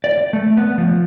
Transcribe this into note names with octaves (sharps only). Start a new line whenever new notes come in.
D5
A3
B3
F3